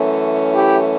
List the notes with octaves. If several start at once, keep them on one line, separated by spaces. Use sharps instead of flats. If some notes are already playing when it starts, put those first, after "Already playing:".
Already playing: F#2 E3 A3 C#4
E4 G4